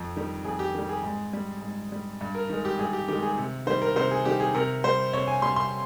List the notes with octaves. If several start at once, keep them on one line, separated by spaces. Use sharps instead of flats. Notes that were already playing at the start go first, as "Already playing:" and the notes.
Already playing: F2
D#3 G3
F2 G#4
G4
D#3 G3
G#4
G#2
G3
G#2
G3
G2
A#4
D#3 G#3 A#4
G4
G2 G#4
G4
D#3 G#3 G4
G#4
C3
D#3 G3 C5
A#4
C3 C5
G#4
D#3 G3 G4
G#4
C3 A#4
G3 C5
C3 C#5
G#5
G3 C6
C6